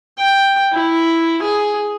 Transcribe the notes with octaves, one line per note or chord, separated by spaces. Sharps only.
G5
E4
G#4